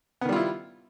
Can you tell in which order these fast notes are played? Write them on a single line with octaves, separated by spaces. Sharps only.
B3 D#3 G3 F4 E4